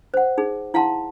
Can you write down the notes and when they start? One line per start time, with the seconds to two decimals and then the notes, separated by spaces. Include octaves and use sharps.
0.14 C5 F#5
0.38 D#4 G#4
0.74 E4 F5 F#5 A5 C6